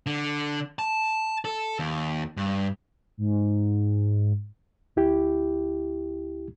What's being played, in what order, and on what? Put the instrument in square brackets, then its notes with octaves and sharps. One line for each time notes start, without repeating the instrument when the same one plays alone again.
[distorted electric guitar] D3
A5
A4
D#2
G2
[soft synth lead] G#2
[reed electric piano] D2 E4 G4